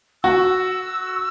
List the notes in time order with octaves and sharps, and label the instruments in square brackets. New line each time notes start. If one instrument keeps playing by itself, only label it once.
[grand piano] F#4 [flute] E6